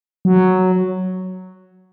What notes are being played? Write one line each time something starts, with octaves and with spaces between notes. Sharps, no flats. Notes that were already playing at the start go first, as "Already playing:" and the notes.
F#3